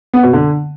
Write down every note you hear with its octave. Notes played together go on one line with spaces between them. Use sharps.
B3
B2
D3